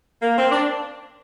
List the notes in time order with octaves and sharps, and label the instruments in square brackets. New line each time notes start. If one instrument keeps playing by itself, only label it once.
[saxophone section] A#3
C4
D4